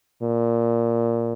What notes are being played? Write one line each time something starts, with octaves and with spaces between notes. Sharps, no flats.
A#2